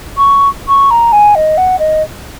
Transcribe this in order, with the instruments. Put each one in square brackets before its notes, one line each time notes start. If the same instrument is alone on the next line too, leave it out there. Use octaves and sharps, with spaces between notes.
[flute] C#6
C#6
A#5
G#5
D#5
F#5
D#5